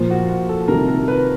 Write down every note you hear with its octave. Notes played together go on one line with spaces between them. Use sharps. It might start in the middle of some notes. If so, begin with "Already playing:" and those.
Already playing: A#2 F3 A#3 F4
F#4
F#4
A4
C3 D#3 G3 A#3 A#4
A#4
B4